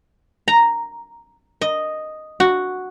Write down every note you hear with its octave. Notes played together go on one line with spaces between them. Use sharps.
A#5
D#5
F#4